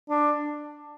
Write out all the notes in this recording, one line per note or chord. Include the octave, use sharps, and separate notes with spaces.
D4